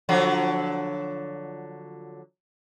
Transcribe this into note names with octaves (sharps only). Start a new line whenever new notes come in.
D3 F3 F#3